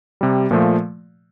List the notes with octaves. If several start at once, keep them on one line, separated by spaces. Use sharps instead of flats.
C3 G3
A#2 F3 A3